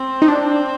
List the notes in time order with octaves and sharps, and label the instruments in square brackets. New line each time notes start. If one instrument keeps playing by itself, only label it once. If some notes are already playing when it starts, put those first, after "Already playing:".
Already playing: [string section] C4
[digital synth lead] D#4
D4